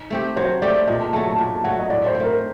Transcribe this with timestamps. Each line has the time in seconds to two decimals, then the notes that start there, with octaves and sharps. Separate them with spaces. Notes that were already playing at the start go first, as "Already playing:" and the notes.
Already playing: D#4
0.10 A3 C4 G4
0.36 F#3 C5
0.62 A3 C4 G4 D5
0.88 A#2 D#5
1.00 A5
1.13 A3 A5
1.16 F#3
1.26 A5
1.38 A#2 A5
1.64 F#3 A3 F#5
1.80 D#5
1.90 A2 D5
2.06 C5
2.15 C4
2.20 A3 A#4